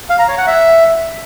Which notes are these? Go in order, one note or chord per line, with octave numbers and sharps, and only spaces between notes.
F5
A#5
C#5
F#5
E5